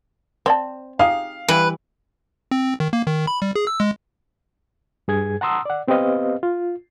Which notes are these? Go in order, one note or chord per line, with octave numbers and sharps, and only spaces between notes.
C4 C5 D5 A5
D#4 G4 G#4 F5
E3 G3 E4 B4
C4
D#3
A#3
D#3
B5
G3
G#4
E6
G#3
G2 G#4 G#6
F#5 A5 A#5 C6 D#6 E6
D5 F#5
B3 C4 G4 B4 D#5 F5
F4